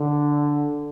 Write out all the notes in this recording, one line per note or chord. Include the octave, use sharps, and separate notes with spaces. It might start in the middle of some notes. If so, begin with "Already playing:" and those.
Already playing: D3